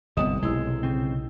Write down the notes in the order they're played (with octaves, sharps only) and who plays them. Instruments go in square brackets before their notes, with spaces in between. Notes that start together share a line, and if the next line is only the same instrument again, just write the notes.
[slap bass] G1 C2 B3 [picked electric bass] C3 [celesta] D#5 D#6 E7
[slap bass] B1 C3 [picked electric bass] G#3 [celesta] E4 E6
[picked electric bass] C#3 C4